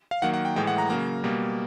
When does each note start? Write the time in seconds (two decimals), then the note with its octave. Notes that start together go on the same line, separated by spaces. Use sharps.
0.11 F5
0.22 D#3 F#3 A#3 F#5
0.34 F#5
0.45 G5
0.56 A2 E3 G#3 G5
0.67 F#5
0.78 A#5
0.90 C#3 F#3 A#3 A#5
1.24 B2 G3 A#3